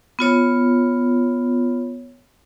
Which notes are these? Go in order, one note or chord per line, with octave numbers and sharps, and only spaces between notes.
B3 F4 C#5